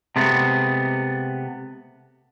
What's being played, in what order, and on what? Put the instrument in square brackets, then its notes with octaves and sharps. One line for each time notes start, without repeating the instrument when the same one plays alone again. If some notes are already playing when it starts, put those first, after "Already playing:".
[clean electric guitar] C3 G#3 A3 B3